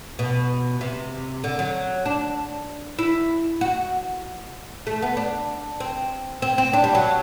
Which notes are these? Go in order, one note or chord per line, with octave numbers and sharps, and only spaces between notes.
B2
C3
D3
F#3
D4
E4
F#4
A3
B3
D4
C4
C4
C4
D4
G3
F#3